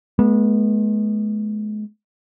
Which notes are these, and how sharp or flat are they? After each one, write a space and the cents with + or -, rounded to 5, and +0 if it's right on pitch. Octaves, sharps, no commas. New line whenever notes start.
G#3 +35 B3 -30